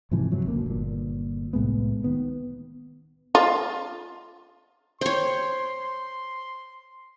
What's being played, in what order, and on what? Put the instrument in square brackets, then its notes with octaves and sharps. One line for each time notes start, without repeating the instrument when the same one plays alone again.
[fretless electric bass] G#2 C3 E3 F3
G2 C3 F3 F#3
G#1 D2 C#3 A#3
G1 A#2
C2 A2 G#3 B3
D#3 B3
[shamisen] F4
[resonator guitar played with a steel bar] C5 [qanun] C#5 G5 [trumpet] C6